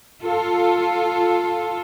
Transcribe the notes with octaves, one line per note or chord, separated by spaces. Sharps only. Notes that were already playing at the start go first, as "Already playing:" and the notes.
F4 A4